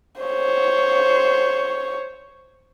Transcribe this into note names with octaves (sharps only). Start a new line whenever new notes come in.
C5 C#5